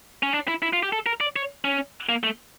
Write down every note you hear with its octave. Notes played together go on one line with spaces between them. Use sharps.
C#4
D4
E4
E4
F4
G4
A4
A#4
D5
C#5
C#4
A#3
A3